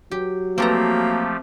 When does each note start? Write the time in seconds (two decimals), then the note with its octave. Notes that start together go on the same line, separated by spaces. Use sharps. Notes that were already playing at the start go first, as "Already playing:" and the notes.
0.11 F#3 G4
0.58 F3 A3 A#3 C4 G4 A4 A#5